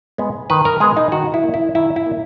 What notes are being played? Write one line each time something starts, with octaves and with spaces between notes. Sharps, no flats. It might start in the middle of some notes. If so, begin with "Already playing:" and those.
G#3 B3
D#3 B4
A#4
G#3 B3 G#4
D#4
D#3 F#4
E4
A#3
E4
D#3 E4
E4
A#3